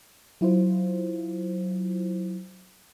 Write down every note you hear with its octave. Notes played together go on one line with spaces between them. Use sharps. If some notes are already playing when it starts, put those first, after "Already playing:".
F#3 E4 F4 C5